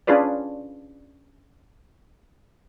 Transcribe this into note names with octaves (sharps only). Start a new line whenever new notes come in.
C#4 D4 F4 G#4 B4 D5